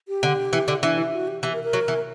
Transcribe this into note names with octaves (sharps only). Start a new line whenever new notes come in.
G4
D3
E3
D3
E3 D4
E4
F#4
G4
E3 G4
A#4
A#4
F#3
E3